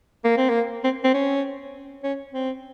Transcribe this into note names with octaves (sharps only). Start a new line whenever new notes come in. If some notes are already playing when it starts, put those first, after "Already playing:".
A#3
C4
A#3
C4
C4
C#4
C#4
C4